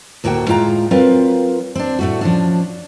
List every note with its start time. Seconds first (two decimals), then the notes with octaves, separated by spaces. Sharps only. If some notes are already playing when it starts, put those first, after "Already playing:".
0.24 D2 A2 A#3 F#4 G5
0.47 A2 G#3 F4 G5 A#5
0.91 F#3 C4 F4 A#4 B4
1.75 C4 D4
1.99 A2 A3 F#4
2.21 F3 C#4 D4